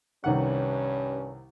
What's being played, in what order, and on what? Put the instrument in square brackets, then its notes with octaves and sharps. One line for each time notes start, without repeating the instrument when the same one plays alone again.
[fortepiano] C2 D#3 F#5 [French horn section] G2 C#4